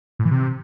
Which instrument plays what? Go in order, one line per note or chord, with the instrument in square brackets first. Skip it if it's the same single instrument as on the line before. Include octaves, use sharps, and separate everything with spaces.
[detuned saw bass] A2
E3
C3